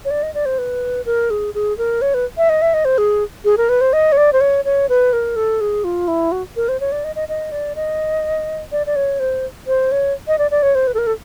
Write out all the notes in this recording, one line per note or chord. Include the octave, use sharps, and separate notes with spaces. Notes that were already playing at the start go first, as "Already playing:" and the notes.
C#5
D5
D#5
D5
C5
B4
A#4
G#4
G#4
A#4
C#5
B4
E5
D#5
E5
D#5
C5
G#4
G#4
A#4
B4
C5
D#5
C#5
D5
C5
C#5
C#5
B4
A#4
A4
G#4
F4
E4
F#4
A#4
C5
C#5
D5
D#5
D#5
D#5
D5
D#5
D5
D5
C#5
C5
C5
C#5
D#5
D5
D5
C#5
C5
B4
A4
A#4
A4